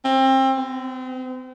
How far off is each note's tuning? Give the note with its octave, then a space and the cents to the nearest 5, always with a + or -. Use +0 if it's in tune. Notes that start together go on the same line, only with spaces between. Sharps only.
C4 +25
C4 -35